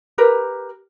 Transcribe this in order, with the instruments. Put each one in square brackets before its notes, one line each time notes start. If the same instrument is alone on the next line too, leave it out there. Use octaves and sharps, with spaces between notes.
[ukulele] G4 A#4 B4